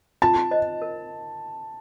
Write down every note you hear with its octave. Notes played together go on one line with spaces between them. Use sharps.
F4 A5
C5 D#5
A#4